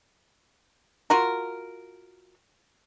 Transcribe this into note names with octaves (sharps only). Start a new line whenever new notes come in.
F4 F#4 A#4